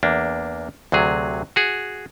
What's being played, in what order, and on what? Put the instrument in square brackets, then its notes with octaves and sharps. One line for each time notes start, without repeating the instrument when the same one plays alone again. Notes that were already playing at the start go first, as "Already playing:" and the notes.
[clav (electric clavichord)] E2 A#3 D4
D2 C3 F#3 G#4
F#4 G#4